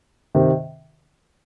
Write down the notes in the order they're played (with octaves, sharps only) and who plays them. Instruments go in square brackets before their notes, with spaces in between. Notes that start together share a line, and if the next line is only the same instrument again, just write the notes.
[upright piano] C3 D#3